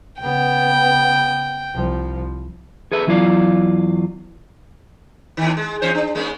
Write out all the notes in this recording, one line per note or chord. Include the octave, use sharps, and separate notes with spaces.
C#3 B3 G5
C2 F3
G#4 A4 B4 E5
E2 F#3 E4 F4 D5 F5
D#2 D#3
G#3
E2 C#4 C5
D4
G#3 A#3 C#4